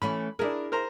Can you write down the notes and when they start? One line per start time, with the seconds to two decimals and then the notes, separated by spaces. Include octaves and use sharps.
0.02 E3 A3 C#4 B5
0.39 D4 E4 G#4 A#4
0.72 A#4 C5 A#5